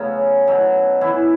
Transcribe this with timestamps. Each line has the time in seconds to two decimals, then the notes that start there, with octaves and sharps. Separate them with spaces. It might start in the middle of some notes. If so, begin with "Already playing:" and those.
Already playing: C#3 F#3 A3 B3 C#4
0.47 B2 F#3
1.01 E3 E4